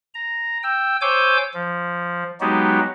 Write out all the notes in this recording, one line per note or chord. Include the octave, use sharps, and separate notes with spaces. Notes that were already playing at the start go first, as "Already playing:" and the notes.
A#5
G5 E6
C5 C#5 G#5 D6 E6 G6
F3
F#3 G#3 B3 D#4 F#4 G4